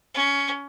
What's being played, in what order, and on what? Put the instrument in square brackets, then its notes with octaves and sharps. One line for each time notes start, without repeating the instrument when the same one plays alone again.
[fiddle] C#4